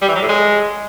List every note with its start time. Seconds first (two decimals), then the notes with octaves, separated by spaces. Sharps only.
0.02 G3
0.08 E3
0.15 F#3
0.22 A2
0.28 G#3